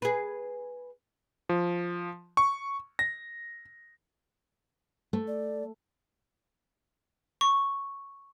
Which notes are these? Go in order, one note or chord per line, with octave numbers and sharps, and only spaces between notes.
G#4 B4
F3
C#6
A#6
A3
D5
C#6